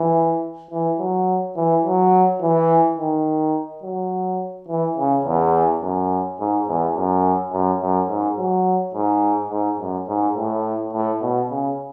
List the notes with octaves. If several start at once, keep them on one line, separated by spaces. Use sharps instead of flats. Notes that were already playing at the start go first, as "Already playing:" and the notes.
Already playing: E3
E3
F#3
E3
F#3
E3
D#3
F#3
E3
C#3
E2
F#2
G#2
E2
F#2
F#2
F#2
G#2
F#3
G#2
G#2
F#2
G#2
A2
A2
B2
C#3